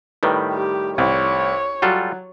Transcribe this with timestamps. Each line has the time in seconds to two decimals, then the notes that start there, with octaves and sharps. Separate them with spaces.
0.23 A2 D#3 G3 B4
0.53 G4
0.98 C2 C#5
1.82 F#3 G3 F4 A4